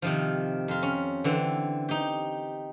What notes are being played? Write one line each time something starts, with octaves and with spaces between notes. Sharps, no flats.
C3 D#3 F3
F2 F4
C#4
D3 E3 C4
D#4 G4